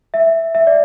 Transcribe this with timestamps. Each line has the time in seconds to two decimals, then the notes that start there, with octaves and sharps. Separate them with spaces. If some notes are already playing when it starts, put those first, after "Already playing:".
0.14 E5
0.55 E5
0.67 D5